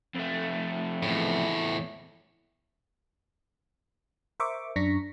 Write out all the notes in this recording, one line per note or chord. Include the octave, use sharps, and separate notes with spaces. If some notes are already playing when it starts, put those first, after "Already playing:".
F2 A3
E2 A2
A#4 C5 E5 C#6 D6
F#2 D4 A#5 C#6 A#6 B6